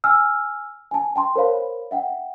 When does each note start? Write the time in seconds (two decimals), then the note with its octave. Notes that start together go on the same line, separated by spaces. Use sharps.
0.04 G#5 E6 F6
0.91 G#5 A5
1.16 G5 A5 C6
1.36 A#4 C5 C#5 F5 B5
1.91 E5 F#5 G5